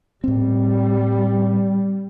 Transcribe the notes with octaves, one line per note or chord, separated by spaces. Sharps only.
A2 G3 C4